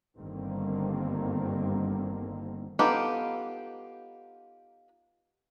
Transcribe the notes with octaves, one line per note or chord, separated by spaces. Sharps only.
G1 D3 D#3 G3 A#3 C4
B3 D#4 F4 G4 A4